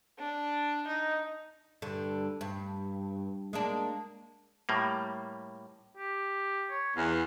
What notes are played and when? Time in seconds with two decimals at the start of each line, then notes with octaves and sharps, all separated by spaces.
0.19 D4
0.87 D#4
1.82 G2 D3
2.41 G2
3.53 G#3 A#3 D4
4.69 A2 G3 A#3
5.97 G4
6.70 C#5
6.97 E2 F5